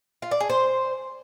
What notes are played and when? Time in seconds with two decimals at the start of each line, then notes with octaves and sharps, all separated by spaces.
0.22 F4
0.31 D5
0.40 G#4
0.50 C5